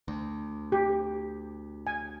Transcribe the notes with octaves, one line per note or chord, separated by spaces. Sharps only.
D2
G4
G#5